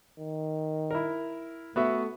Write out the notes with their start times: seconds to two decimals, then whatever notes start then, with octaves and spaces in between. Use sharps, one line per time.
0.19 D#3
0.91 E4 A#4
1.76 A3 B3 F#4 E5